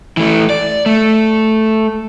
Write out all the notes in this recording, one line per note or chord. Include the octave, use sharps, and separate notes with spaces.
E3 A3
D5
A3